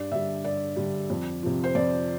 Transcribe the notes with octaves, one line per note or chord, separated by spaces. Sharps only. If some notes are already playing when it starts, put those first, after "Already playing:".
Already playing: G2 D5
D3 G3 E5
G2 D5
D3 G3
F2
C3 F3
C5
F2 D5